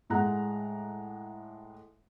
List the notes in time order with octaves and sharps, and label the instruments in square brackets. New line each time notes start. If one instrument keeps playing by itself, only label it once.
[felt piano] A2 G#3 F#5 A#5 F#6